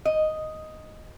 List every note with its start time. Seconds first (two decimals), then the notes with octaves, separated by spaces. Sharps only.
0.05 D#5